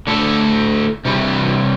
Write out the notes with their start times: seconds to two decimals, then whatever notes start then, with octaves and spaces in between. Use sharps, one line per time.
0.07 D3 A3 E4 A4
1.05 C3 E3 G3